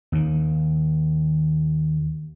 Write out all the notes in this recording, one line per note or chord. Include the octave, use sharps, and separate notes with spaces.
D#2 D#3